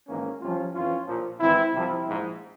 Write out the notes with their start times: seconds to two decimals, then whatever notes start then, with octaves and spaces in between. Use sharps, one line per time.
0.08 G#1 G#2 E3 A#3 C#4
0.42 C2 C3 F3 C#4 F4
0.74 F2 E3 C#4 F4
1.07 A#1 A#2 F3
1.40 G#1 G#2 E3 C4 E4
1.73 C2 C3 F3 C4 E4
2.06 A#1 G#2 F3